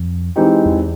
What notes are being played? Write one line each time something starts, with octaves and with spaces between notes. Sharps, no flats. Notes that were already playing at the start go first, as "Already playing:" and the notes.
Already playing: F2
E3 G#3 C4 D#4 G4
E2